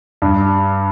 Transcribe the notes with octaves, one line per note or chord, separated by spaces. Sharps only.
G2